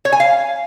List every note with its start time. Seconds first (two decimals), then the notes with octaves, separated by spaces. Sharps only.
0.05 C#5
0.12 G#5
0.20 F5